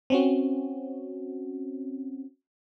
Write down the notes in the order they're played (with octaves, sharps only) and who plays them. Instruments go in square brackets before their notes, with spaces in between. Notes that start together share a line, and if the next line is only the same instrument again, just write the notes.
[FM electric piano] C4 C#4 F#4